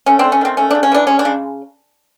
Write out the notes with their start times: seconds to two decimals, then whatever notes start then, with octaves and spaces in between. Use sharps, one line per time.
0.06 A3 C#4
0.19 C4 D4
0.24 A3
0.32 C#4
0.41 D#3 C4
0.57 A3 C#4
0.71 C#3 D4
0.83 C#4
0.92 E3 D4
1.07 G#3 C#4
1.19 D4
1.25 C#3